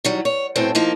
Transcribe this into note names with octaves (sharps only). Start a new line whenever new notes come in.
D#3 F#3 G3
C#5
F#2 A2 B3 C4 C5 G5
F3 A#3 D#4